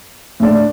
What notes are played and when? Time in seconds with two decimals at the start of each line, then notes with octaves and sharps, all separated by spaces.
0.40 A2 A3 D4